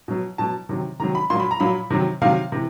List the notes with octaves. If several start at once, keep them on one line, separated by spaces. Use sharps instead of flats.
B2 F#3
B2 F#3 A5
C3 D#3 F#3
C3 D#3 F#3 A#5
B5
A#2 F#3 C6
B5
A#5
A#2 F#3 B5
C3 D#3 F#3
C3 D#3 F#3 F5
C3 E3